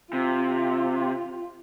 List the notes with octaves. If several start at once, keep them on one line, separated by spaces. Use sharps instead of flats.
C3 F4